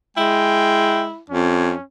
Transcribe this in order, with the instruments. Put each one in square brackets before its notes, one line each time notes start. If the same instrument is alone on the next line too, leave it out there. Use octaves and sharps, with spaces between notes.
[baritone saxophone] G#3 [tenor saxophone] E4 [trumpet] G5
[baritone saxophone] F2 [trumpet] C#4